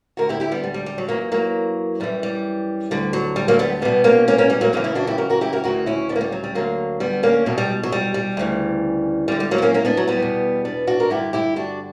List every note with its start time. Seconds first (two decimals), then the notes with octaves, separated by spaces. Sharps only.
0.17 D2 D3 F#4 A#4
0.29 E4 G4
0.40 E4 G4
0.52 G3 B3
0.63 G3
0.74 G3
0.86 G3
0.98 F#3
1.09 F#2 E3 F#3 A#3
1.32 F#3 A#3
2.00 F#2 E3 G3
2.23 G3
2.91 D2 D3 G3
3.13 F#3
3.36 G3
3.48 F#3 A#3
3.59 G3 B3
3.81 E2 B2 G3 B3
4.04 A#3 C#4
4.28 A#3 C#4
4.38 A#3 C#4
4.50 G3
4.61 F#3 A#3
4.73 F#2 C#3 E3 A#3 C#4
4.84 C#4 E4
4.95 D4 F#4
5.07 E4 G4
5.18 F#4 A#4
5.30 F#4 A#4
5.41 E4 G4
5.53 F#4 A#4
5.64 D2 C#3 E3 F#4 A#4
5.86 C#4 E4
6.09 B3 D4
6.16 A#3
6.21 G3
6.32 F#3
6.44 G3
6.55 D2 D3 F#3 A#3
7.00 G3 B3
7.23 A#3 C#4
7.46 E2 B2 F#3 A#3
7.58 G3
7.83 F#3
7.92 G3
8.14 G3
8.37 D2 C#3 E3
9.28 E2 D3 G3
9.40 G3
9.51 F#3 A#3
9.58 B3
9.62 A#3 C#4
9.74 A#3 C#4
9.85 B3 D4
9.97 F#3
10.08 G3 B3
10.20 E2 B2
10.65 B3 D4
10.87 D4 F#4
11.00 A#4
11.10 G2 D3 E4 G4
11.33 E4 G4
11.56 D4 F#4